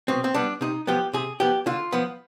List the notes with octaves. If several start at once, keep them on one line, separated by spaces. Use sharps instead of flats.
B2 C4
C4
G3 B3 D4
C3 D#4
F3 B3 G4
C3 G#4
F3 B3 G4
D3 F4
F3 B3